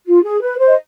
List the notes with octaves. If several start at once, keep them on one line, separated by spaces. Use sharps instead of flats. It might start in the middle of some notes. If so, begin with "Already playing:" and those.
F4
G#4
B4
C5
D#5